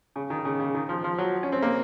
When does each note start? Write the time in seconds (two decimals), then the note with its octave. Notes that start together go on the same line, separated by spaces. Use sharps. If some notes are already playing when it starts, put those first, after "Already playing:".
0.16 C#3
0.30 D#3
0.45 C#3
0.60 C#3
0.74 D#3
0.89 F3
1.04 F3
1.18 F#3
1.43 C#4
1.52 C4
1.62 A#3